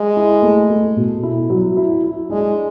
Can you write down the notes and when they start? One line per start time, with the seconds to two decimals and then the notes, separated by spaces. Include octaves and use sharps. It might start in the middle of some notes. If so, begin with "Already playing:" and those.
Already playing: G#3
0.17 E4
0.42 A3
0.70 A3
0.96 B2
1.23 E4
1.50 F#3
1.77 E4
2.04 E4
2.30 G#3 D4